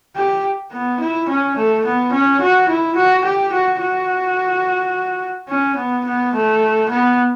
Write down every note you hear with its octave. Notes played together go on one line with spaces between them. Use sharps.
G4
B3
E4
C#4
A3
B3
C#4
F#4
E4
F#4
G4
F#4
F#4
C#4
B3
B3
A3
B3